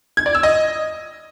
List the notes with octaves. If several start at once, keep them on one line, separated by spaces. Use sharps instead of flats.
G#6
D5
E6
D#5